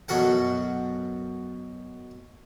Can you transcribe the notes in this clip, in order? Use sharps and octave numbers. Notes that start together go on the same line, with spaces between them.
F#2 B2 F#4 A4 F#5